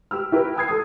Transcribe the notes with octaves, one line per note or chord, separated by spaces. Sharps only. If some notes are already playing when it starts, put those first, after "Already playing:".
G4 E6 F6
E4 G4 A#4 B4
G5 D#6 G#6 C7
A4 D#6